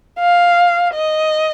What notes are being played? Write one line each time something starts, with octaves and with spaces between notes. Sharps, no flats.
F5
D#5